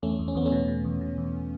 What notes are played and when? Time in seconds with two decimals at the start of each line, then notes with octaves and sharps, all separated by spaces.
0.03 E2 A3 C#4
0.19 E2
0.28 C#4
0.35 E2 B3
0.45 A3 C#4
0.52 B2
0.68 B2
0.85 E2
1.01 B2
1.18 E2